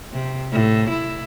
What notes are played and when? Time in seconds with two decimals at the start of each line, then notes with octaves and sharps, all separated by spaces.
0.13 C3
0.52 A2
0.90 E4